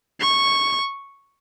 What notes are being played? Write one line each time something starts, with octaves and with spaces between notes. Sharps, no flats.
C#6